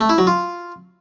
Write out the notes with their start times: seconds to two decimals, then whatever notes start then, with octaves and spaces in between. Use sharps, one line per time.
0.01 A3
0.09 E4
0.18 F#3
0.27 F4